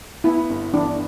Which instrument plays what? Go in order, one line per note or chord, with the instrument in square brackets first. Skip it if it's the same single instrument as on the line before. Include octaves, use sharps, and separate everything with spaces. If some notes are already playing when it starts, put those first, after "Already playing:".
[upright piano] B3 [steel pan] E4
[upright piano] G1
[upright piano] E3 [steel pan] D4